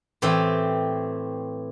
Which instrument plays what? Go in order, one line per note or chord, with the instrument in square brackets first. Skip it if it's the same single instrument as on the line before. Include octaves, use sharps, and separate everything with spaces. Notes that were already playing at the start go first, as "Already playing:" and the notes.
[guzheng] A2 E3 C4 G4